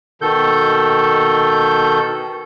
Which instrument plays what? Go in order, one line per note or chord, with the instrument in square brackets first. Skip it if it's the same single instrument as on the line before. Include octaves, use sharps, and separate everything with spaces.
[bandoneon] B2 D#3 A4 G6